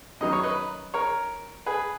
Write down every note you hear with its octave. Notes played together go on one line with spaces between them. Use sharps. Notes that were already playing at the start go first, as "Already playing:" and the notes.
F#2 D#3 F#3 B3 D#4 D#5
C#5
B4 D#5
A#4 C#5
G#4 B4